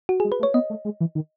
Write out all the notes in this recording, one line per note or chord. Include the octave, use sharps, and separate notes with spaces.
F#4
G#3 G#4
B4
A3
C#5
B3 D#5
A3
G#3
E3
D#3